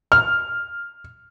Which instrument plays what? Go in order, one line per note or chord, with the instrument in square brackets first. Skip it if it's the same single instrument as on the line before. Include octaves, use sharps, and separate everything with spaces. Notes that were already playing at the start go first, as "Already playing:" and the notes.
[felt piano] F6